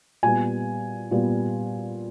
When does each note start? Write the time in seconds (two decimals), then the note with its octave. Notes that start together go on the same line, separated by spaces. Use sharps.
0.23 A#2 G3 B3 G#5
1.11 A#2 G3 B3